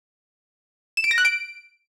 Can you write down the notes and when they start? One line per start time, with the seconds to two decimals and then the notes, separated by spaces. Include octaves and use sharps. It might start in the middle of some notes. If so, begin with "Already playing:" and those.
0.97 E7
1.04 D7
1.11 A#6
1.18 F#6
1.25 D7